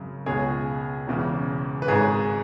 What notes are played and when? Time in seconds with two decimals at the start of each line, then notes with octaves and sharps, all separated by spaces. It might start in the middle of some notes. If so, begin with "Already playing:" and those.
Already playing: G#1 F#2 C#3 F#3
0.26 C#2 B2 G#3 G#4 C#5
1.07 E1 E2 C#3
1.82 B4
1.88 G#1 G#2 G#3 G#4 C#5